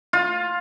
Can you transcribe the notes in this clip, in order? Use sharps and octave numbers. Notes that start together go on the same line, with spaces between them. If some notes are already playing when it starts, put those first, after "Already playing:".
F4